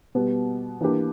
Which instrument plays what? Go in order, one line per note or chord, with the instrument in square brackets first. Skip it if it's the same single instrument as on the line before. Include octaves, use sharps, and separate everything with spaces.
[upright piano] B2 G3 B3
E3 A#3 D4 G4 B4